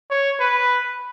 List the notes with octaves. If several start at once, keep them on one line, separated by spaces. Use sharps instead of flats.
C#5
B4